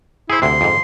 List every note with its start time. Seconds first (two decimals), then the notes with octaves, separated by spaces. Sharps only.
0.30 E4 G#4 C5
0.42 D2 C3 C6
0.61 F2 G#2